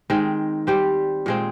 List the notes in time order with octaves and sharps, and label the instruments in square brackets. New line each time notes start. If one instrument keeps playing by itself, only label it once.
[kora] D#3 G#3 C4
G3 C4 G4 C5
A#2 G#3 C4